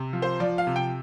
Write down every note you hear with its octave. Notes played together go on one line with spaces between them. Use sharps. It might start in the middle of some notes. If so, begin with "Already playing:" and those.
Already playing: C3
F3
C5
F3 D5
F5
C3
G5